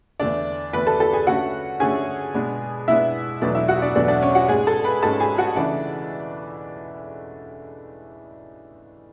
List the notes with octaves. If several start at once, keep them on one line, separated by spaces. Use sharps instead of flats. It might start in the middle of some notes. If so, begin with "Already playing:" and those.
E2 D3 A3 D4 D5
E2 D3 A3 D4 B4 B5
A4 A5
A4 A5
G#4 G#5
D3 A3 C#4 F#4 F#5
D3 A3 C#4 G#4 G#5
B2 G#3 B3 D4
B2 G#3 B3 D4 E4 E5
E2 B2 F#3 A3 D4 D5
E4 E5
F#4 F#5
D4 D5
E2 B2 F#3 A3 D4 D5
D4 D5
C#4 C#5
F#4 F#5
G#2 G#3 C#4 G#4 G#5
A4 A5
B4 B5
G#2 G#3 C#4 A4 A5
G#4 G#5
F#4 F#5
C#3 E3 A3 D4 D5